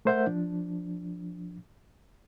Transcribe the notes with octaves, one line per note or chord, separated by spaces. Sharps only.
A3 A#4 C5 E5 F#5 G6
F3 D4